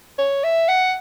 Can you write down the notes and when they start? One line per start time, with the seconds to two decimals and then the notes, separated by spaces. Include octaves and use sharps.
0.18 C#5
0.44 E5
0.69 F#5